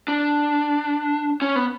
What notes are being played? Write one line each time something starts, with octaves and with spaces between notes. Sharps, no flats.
D4
C#4
B3